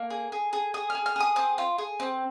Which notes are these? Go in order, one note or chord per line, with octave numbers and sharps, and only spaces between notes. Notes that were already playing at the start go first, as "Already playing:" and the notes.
Already playing: A#3
G#4
G#4
G#4
G#4 D#6
F6
G#4
F6
G#4 D#6
C4 D#6
F4
G#4
C4